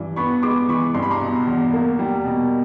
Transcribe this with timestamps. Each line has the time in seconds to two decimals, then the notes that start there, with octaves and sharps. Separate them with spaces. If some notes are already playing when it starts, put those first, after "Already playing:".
Already playing: G2 E3
0.16 B3 B5 C#6
0.42 G#3 C6 D6
0.69 E3 B5 C#6
0.95 G2 C6
1.03 B5
1.11 A#5 C6
1.21 B2
1.47 E2
1.73 A#3
1.99 G3
2.25 B2